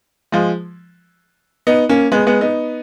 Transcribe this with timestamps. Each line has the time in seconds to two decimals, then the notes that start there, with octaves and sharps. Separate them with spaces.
0.32 F3 G#3
1.67 B3 D#4
1.89 A#3 C#4
2.12 G#3 B3
2.27 G#3 B3
2.41 B3 D#4